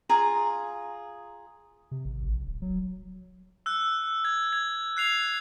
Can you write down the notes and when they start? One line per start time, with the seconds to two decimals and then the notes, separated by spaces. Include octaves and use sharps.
0.09 F4 G#4 A#5
1.91 C3
2.05 G#1
2.23 A#1
2.46 D1
2.62 F#3
3.66 E6 F#6
4.25 G#6
4.53 G#6
4.97 F#6 C7 F7